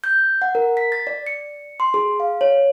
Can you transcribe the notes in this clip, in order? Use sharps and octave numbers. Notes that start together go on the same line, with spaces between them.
G6
F#5
A#4
B6
A6
D5
C#7
C6
G#4
F5
C#5